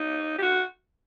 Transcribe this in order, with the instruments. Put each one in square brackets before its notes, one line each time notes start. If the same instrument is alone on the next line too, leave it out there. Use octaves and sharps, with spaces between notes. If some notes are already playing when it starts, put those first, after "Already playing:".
Already playing: [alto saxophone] D#4
G4
F#4